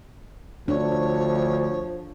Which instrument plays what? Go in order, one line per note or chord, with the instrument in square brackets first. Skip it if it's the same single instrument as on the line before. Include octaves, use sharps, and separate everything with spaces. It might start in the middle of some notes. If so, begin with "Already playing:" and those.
[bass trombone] D2 [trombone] F3 [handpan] D4 [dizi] C#5